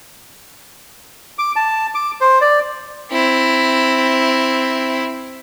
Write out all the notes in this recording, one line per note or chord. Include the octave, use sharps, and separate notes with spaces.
D6
A5
D6
C5
D5
C4 E4